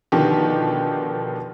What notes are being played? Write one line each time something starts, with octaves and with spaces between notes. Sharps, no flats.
B2 D3 D#3 F3 G4